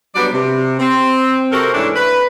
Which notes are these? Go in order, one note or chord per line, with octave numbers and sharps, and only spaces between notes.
F#3 G3 B3 D4 F#4 D5
C3
C4
C3 C4 F#4 A4 A#4
G#2 E3 A3 C#4 D4
B4